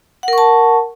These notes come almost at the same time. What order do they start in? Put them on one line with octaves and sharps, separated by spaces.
F#5 A#4 C#6 A5